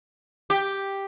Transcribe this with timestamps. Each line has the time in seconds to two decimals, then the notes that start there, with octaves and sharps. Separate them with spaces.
0.50 G4